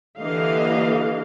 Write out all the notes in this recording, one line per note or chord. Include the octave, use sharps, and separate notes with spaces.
D3 E3 A#3 G4 D#5 F5